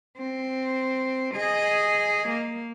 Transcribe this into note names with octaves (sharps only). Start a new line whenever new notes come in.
C4
G#4 D#5
A#3